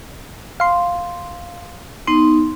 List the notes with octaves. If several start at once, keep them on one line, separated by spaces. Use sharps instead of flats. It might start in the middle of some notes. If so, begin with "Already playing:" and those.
F5 C6
B3 D#4 C6